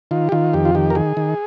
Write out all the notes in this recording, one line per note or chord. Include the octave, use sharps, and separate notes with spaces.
D#3 F4
G4
D#3 F4
F2 G4
F4
D#3 G4
A#4
D#3 G#4
D#3